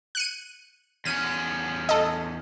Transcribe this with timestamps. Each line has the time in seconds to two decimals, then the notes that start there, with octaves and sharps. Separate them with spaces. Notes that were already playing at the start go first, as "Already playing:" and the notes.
0.15 F#6 C#7 D#7
1.05 E2 C#4 D#7
1.89 A4 D#5